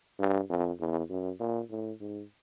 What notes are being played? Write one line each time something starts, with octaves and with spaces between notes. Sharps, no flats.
G2
F2
E2
F#2
A#2
A2
G#2